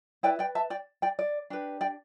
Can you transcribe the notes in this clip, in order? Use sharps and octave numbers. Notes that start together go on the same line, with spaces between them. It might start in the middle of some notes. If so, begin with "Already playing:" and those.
E4 B4 D5 G5
D5 G5
E5 A5
D5 G5
D5 G5
D5
D4 G4 B4
D5 G5